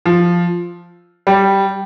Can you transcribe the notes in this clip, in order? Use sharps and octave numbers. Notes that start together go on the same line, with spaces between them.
F3
G3